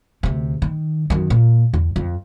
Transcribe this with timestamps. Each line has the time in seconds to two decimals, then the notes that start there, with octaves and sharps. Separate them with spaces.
0.23 D2 C3
0.62 D#3
1.10 F#2 D#3
1.30 A#2
1.74 E2
1.96 F2